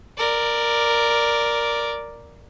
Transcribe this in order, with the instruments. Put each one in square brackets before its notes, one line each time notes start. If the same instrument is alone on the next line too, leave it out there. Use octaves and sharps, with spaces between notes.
[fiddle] A#4 D5